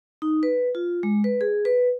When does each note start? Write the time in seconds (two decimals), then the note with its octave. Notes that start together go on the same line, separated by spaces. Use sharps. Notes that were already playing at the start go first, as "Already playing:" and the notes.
0.22 D#4
0.43 B4
0.75 F4
1.03 G#3
1.24 B4
1.41 G#4
1.65 B4